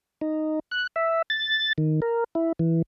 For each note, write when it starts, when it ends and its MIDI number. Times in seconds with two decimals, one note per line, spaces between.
0.21 0.59 63
0.71 0.87 90
0.96 1.22 76
1.30 1.73 93
1.78 2.00 51
2.02 2.24 70
2.35 2.52 64
2.59 2.82 52